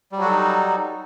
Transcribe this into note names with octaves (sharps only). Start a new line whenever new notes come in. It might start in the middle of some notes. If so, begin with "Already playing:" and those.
F#3 G3 D#4 F#4 A4